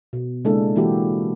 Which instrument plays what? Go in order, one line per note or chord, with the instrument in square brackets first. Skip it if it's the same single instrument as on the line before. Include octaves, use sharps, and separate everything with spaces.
[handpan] B2
C#3 G#3 A#3 D4 E4 A4
E3 A#3 E4 F#4 G4